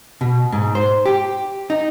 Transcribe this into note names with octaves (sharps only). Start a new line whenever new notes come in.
B2
G#2
C5
G4
D#4